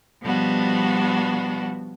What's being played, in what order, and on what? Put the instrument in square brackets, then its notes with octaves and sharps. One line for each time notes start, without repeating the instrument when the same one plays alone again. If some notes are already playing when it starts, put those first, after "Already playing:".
[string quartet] B2 F3 G3 B3 D4 F#4